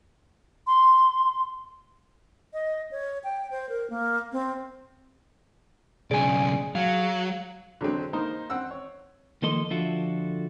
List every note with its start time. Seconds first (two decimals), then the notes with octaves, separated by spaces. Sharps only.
0.67 C6
2.53 D#5
2.91 C#5
3.24 G5
3.51 C5
3.69 A#4
3.90 A#3
4.32 C4
6.11 B1 C#3 G#4 D5 G#5
6.75 F#3 F5
7.81 D3 F#3 G#3 C4
8.13 A#3 D#4 C5
8.50 C4 F#5 E6
8.71 C#5
9.42 D#3 F3 A#3 A4 D#5 C6
9.70 D3 F3 F4 F#4 A4 E5